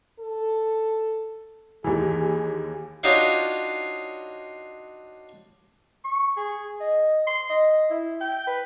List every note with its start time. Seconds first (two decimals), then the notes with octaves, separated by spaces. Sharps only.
0.20 A4
1.84 D#2 E3 G#4
3.03 D4 D#4 F4 F#4 C#5 F5
6.04 C#6
6.37 G#4
6.80 D#5
7.27 C6
7.50 D#5
7.91 E4
8.21 G5
8.47 B4